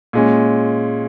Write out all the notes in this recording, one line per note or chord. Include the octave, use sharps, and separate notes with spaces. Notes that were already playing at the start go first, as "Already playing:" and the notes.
A#2 G#3 C#4